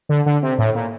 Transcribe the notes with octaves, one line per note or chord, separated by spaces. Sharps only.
D3
D3
C3
A2
A#2